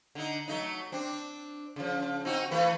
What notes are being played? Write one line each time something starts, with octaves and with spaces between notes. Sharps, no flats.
D3 D#4
F#3 A3 D#4
C4 D4
C#3 F3
C4 D#4 F#4
E3 A3 B4